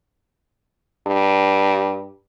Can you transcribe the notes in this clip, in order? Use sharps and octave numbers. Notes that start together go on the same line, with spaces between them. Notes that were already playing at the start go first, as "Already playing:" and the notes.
G2